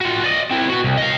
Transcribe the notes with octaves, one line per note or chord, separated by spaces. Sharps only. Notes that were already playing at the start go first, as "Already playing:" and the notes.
F4 F#4
D5 D#5
C4 E4
B3 F#4
C2
D#5 F5